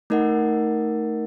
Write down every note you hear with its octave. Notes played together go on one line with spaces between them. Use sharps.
A3 D#4 A#4 D#5 F#5